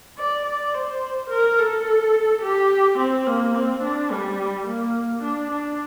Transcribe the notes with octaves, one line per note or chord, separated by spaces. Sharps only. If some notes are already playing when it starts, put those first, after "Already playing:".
D5
D5
C5
A#4
A4
G4
C4
A#3
C4
D4
G3
A#3
D4
D4